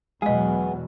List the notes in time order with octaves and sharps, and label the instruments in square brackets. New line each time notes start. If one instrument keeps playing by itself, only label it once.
[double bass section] E2 B2 F#3 [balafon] G#3 D#5 [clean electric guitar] B3 G#4